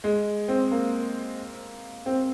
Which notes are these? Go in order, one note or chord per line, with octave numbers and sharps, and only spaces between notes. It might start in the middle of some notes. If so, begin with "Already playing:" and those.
G#3
C4
A#3
C4